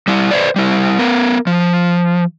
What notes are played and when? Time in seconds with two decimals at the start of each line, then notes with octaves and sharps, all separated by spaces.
0.08 G3 E4
0.31 B4 C5 D5
0.56 G3 E4
0.98 B3 A#4
1.47 F3